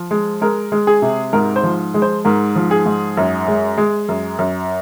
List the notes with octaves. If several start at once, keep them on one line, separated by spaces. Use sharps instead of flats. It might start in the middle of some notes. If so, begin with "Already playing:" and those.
Already playing: F3
G#3
G#3 A#4
G#3
G#4
C3
G#2 A#4
C5
F3
G#3
C5
G#2 A#4
F3
G#4
G#2
F#2
G#3
G#3
F#2
F#2